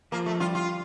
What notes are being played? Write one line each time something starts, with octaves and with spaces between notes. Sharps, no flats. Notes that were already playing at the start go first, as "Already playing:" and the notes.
F3 A#3
A3
G3 F4
F4